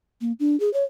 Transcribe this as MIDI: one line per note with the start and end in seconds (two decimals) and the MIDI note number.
0.21 0.32 58
0.40 0.58 62
0.60 0.72 68
0.73 0.84 73